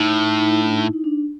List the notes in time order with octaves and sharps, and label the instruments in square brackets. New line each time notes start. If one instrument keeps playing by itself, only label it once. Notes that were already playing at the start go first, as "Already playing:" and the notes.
Already playing: [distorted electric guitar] A2 [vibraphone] D#4
[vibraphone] D#4
E4
D4
D#4
E4
D#4
D4